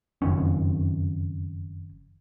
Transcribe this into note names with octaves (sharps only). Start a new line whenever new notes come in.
F#1 F2 D#3 C#4